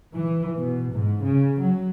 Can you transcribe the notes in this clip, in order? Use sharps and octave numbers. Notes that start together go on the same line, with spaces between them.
E3
B2
G#2
C#3
F#3